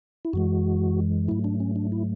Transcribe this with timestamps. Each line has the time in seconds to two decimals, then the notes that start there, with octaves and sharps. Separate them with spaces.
0.25 E4
0.33 F#2 E3 G#3 F#4
1.28 G#2 F#3 A3 E4
1.44 D4
1.60 C#4
1.76 D4
1.92 E4